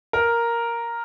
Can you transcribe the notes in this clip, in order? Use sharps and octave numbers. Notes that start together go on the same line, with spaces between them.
A#4